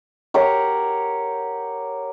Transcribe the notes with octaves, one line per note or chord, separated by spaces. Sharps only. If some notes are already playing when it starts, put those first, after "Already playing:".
G4 A#4 C#5 F#5